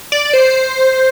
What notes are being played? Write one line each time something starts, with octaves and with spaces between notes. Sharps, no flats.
D5
C5